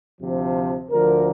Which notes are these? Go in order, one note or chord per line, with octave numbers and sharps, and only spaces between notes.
D2 C3 F3
D2 D3 F3 A#4